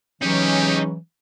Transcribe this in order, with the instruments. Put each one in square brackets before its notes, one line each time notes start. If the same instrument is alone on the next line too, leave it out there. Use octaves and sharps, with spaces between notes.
[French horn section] C#3 G#3 C#4 [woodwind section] E3 F#3 [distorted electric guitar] D#4 C#5 [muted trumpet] G4